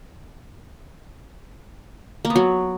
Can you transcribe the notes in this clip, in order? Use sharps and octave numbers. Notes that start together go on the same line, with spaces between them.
A#3
B3
F#3